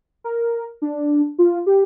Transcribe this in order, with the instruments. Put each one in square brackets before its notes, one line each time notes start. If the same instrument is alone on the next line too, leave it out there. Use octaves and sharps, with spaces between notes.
[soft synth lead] A#4
D4
F4
G4